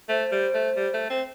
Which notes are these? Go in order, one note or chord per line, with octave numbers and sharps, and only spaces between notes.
A3 C5
G3
A3
G3
A3
C4